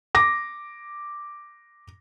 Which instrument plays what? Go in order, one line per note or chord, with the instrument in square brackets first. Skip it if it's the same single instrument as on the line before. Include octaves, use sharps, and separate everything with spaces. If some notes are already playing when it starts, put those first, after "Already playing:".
[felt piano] D6 A#6